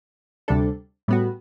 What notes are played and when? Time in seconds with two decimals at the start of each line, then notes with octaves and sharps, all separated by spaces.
0.48 D2 C3 G3 D4 A4
1.08 A2 G3 B3 F#4